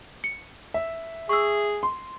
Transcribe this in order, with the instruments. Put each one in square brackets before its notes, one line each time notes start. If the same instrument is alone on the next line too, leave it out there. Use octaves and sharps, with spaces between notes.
[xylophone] C#7
[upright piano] E5
[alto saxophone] G#4 [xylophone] C#6 E6
[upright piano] C6